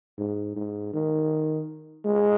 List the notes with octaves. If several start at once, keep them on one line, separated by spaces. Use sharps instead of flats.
G#2
G#2
D#3
G#3